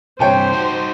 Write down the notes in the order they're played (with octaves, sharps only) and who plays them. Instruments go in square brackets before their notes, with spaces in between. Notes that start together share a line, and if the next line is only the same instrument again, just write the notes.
[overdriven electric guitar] G2 C3 [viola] C5 [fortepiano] C#5 G5 A5
[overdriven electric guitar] D#4 F#4